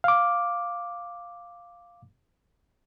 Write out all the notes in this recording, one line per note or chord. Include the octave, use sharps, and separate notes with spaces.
F5 D6